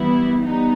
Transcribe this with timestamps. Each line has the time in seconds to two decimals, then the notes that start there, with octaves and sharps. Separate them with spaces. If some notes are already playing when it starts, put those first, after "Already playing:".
Already playing: E3 G3 B3 E4
0.42 G3 B3 D#4